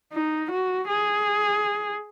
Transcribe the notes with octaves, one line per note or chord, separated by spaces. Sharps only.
D#4
F#4
G#4